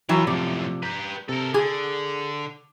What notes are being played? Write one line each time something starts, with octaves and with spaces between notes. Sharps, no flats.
E3 F#3 F4 A#4 G5
F#2 A2 C3 F3 D5
G4 B4 A#5 G6
C3 A4 A#4
D3 G#4 D6